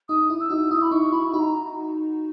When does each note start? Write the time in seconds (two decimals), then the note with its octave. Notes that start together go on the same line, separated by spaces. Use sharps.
0.09 D#4 D#6
0.30 E4
0.40 E6
0.50 D#4 F#4
0.71 E4 D#6
0.82 B5
0.91 D#4 C#6
1.13 E4 B5
1.33 D#4 F#4 B5
1.39 A#5